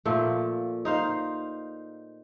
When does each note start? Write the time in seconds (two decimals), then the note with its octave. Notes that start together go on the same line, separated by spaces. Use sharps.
0.05 A#2 F3 A3
0.85 D#4 C5 F5